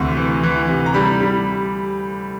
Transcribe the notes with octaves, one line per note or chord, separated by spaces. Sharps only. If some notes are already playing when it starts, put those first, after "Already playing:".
Already playing: D2 C3 E3
E3
E3
C3
A#5
G3 B5
G3